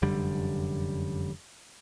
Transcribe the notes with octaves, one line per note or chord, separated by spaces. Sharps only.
F1 F#2 D3 G3